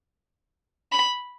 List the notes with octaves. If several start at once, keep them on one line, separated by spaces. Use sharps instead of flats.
B5